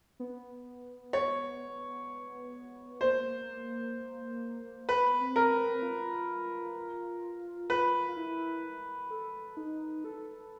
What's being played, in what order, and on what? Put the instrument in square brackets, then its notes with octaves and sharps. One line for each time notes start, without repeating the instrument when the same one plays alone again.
[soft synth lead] B3
[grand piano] C#5
[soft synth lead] A#3 [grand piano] C5
[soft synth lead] B3 [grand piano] B4
[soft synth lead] C4
[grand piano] A#4
[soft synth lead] C4
F4
[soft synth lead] F4 [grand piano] B4
[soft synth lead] F4
E4
A4
D#4
A4